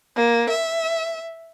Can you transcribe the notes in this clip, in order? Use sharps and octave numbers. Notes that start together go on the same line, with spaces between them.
A#3
E5